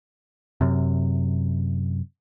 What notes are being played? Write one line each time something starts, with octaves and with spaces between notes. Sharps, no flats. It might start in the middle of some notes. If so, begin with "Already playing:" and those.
F#2 C3